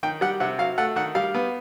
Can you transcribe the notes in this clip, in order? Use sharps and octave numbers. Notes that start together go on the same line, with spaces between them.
D#3 G5
G3 F#5
C3 F#5
F#3 F5
A3 F#5
D#3 F#5
G3 F5
B3